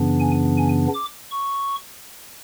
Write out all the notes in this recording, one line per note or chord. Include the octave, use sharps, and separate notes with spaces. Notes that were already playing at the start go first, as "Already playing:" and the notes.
Already playing: F#2 C#3 E3 B3 D4
G#5
G#5
D6
C#6